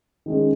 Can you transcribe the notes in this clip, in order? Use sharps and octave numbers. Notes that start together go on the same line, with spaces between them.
D#3 G#3 C#4